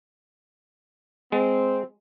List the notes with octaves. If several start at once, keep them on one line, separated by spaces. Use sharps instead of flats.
G#3 C4